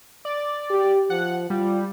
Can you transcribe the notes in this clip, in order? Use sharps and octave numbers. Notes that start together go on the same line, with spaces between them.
D5
G4
F3 F#5
G3 F4